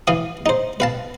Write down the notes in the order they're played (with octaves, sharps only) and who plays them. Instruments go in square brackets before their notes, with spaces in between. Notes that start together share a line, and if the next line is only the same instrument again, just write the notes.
[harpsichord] E3 F5 D#6
D#4 C5
B4 F5 A5